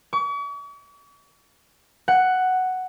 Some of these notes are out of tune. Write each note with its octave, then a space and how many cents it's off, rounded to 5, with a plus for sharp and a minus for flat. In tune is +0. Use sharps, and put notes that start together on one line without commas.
C#6 +45
F#5 +5